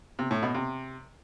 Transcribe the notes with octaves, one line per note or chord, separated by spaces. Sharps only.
C3
A2
B2
C3